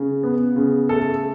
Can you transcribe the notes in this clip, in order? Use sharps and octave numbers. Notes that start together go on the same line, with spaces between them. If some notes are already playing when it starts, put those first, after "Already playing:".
Already playing: C#3
B3
C#3
A3 A4